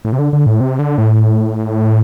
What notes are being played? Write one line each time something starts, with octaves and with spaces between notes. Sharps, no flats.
A2
C3
D3
D3
A2
C3
D3
A2